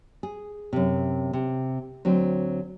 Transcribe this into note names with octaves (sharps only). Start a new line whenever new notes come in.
G#4
F#2 C3
C3
D2 F#3 C4